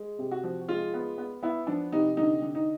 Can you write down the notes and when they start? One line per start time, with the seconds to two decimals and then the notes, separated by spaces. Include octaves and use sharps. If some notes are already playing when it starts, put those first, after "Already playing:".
Already playing: G#3
0.19 C3
0.31 F#4
0.44 F3
0.68 G#3 F4
0.94 B3
1.18 B3
1.43 B3 E4
1.67 F3 D4
1.92 C3 D#4
2.17 D3 D#4
2.42 D3
2.55 D#4